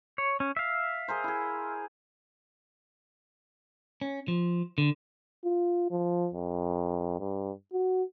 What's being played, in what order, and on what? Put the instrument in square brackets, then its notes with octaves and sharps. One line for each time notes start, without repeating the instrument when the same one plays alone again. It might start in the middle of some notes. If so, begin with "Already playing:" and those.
[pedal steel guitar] C#5
C#4
E5 F5
[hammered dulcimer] G#4 A#4 C5
E4 G#4
[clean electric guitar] C#4
F3
D3
[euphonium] F4
F3
F2
G2
F#4